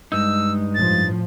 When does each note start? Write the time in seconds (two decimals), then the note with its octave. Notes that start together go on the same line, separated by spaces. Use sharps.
0.12 G2 G#3 D#4 E6
0.75 A2 F3 A6